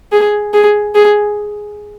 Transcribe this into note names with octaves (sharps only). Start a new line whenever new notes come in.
G#4
G#4
G#4